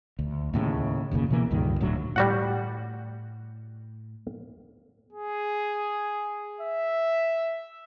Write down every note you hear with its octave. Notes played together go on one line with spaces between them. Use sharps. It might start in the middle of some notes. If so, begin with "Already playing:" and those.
D2
D#2 A2 C#3
F#1 D#2 A#2 C#3
B2 E3 A#3
C#2 G2 D#3
D1 A2 D3 F#3
A2 G3 F#4 F#5
G#4
E5